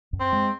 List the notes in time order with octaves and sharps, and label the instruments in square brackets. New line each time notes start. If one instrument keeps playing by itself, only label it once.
[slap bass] F#2
[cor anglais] C4
[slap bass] G#3